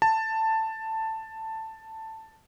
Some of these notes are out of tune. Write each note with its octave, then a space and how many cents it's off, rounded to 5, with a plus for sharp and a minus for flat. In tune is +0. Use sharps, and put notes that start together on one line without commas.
A5 +10